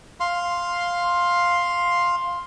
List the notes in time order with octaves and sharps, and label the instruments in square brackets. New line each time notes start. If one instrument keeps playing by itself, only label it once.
[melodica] F5 C6